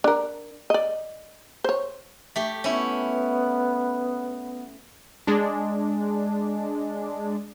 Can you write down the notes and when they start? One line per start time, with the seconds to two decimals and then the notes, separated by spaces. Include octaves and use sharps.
0.04 D4 A#4
0.70 D5 D#5
1.64 C5 C#5
2.36 A3 G4
2.64 B3 C#4 E4
5.27 G#3 D4